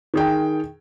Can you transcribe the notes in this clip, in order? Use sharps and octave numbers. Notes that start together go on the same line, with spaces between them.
D#3 G#4 G5